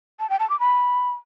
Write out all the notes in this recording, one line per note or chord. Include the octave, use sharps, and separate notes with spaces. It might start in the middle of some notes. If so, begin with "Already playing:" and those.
A5
G5
A5
D6
B5